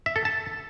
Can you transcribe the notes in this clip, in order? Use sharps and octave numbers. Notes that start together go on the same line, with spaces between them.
E5
A4
A5